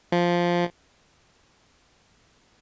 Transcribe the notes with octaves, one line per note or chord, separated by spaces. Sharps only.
F3